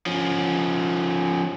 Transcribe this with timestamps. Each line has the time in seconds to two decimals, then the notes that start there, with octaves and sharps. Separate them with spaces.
0.06 F3 C#4